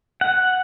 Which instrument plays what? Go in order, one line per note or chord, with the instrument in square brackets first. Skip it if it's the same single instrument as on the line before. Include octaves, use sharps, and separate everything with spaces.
[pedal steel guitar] F#5